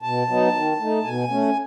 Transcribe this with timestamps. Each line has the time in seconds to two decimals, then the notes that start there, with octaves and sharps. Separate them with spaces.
0.02 B2 A5
0.28 F#3 B3 D#4
0.53 D#3
0.79 A3 D#4
1.04 B2 G#5
1.30 A3 C#4